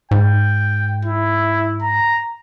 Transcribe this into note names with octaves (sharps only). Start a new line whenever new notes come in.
G#2 G5
E4
A#5